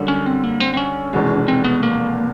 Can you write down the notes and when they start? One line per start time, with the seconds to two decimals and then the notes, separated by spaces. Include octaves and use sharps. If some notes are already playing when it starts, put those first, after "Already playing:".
Already playing: F#2 D3 G3
0.08 C#4
0.26 C4
0.43 A#3
0.60 C4
0.74 C4
0.77 C#4
1.13 F1 E2 B2 G#3
1.48 C4
1.64 B3
1.83 A#3